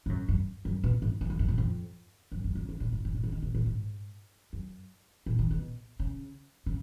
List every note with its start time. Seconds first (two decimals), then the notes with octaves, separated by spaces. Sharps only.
0.06 G#2
0.09 F#2
0.28 F#2
0.65 F#2
0.84 B2
1.02 G#2
1.21 F#2
1.30 F2
1.39 F#2
1.48 G#2
1.58 F2
2.32 F#2
2.44 F#2
2.55 C#3
2.69 C#3
2.80 A#2
2.92 G#2
3.05 G#2
3.15 A#2
3.24 C#3
3.32 D#3
3.42 B2
3.55 A#2
3.66 G#2
4.53 F#2
5.26 A#2
5.39 D#3
5.51 B2
5.99 C#3
6.66 C#3